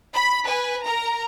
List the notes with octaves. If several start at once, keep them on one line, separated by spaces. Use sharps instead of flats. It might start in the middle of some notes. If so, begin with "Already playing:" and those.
B5
B4 G#5
A#4 A#5